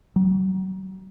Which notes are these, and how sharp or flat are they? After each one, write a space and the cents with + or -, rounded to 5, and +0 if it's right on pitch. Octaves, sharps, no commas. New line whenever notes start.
F#3 +35